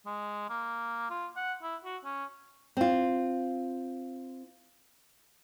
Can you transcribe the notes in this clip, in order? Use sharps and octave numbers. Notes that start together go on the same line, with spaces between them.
G#3
A#3
F4
F#5
E4
F#4
C#4
C4 F4